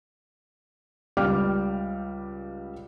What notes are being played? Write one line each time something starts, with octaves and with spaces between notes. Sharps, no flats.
C#2 G3 D5 G5 D6 F6